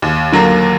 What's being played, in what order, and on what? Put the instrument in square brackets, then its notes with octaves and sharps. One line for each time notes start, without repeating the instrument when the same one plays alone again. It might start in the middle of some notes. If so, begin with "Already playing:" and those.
[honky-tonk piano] D#2
D3 F#3 A#3